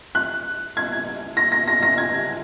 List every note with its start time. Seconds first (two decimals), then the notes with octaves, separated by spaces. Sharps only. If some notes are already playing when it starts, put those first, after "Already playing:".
0.15 F#6
0.77 G#6
1.37 A#6
1.52 A#6
1.68 A#6
1.83 A#6
1.98 G#6